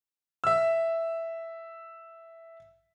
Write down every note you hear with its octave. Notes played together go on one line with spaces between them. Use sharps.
E5 E6